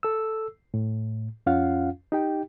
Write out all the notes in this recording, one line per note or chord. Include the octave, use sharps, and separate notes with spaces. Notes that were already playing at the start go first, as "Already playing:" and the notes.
A4 E6
A2
F2 C#4 F4 F5 F#5
D#4 G4 G5